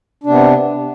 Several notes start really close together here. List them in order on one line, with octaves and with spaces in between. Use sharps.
D4 C3 B3